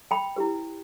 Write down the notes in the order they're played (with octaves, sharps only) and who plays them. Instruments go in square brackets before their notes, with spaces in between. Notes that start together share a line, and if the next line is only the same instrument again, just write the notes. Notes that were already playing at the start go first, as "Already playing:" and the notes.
[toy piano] G5 B5
E4 G4 B4